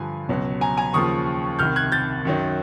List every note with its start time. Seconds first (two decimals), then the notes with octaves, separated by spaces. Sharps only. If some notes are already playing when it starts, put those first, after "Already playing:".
Already playing: G2 D3 F3 G#5
0.29 C#2 B2 F#3
0.61 G#5 A#5
0.77 G#5 A#5
0.93 D#2 C#3 F3 C#6 D#6
1.59 C2 C3 D#3 F6 G6
1.76 F#6 G#6
1.92 G6 A6
2.25 F#2 D#3 F#3